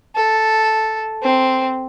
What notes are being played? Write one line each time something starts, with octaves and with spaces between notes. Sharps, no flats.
A4
C4